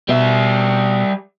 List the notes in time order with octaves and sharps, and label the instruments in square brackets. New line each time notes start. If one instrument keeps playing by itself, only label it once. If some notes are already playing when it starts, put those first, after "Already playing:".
[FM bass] B2 [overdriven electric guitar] G3 E5